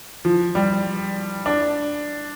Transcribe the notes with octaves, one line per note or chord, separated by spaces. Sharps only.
F3
G3
D4